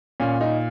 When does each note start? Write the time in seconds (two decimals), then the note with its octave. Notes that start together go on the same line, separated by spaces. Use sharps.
0.20 A#2 C#4
0.41 D#4